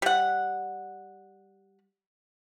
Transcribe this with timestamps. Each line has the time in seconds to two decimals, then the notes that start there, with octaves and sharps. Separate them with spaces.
0.02 G3 F#5